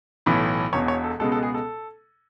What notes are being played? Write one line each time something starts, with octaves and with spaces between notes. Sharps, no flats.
B1 A2 E3
E1 E2 B2 C#5
C#5
A4
C#2 B2 G#3 B3 A4
A4
G#4
A4